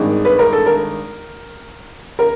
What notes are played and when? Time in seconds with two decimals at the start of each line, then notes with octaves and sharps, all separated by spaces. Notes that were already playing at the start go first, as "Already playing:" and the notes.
Already playing: G#1 G2 D#3 G#3
0.25 B4
0.39 A#4
0.53 A4
0.66 A#4
2.19 A#4